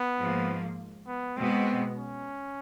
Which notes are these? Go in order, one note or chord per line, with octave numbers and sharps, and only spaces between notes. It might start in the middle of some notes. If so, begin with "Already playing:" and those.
Already playing: B3
G#2 F3 A#3
B3
B2 G#3 B3 C4
C#4